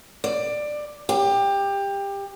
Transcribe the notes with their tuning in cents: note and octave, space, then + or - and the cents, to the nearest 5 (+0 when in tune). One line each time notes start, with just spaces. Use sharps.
D5 +15
G4 +20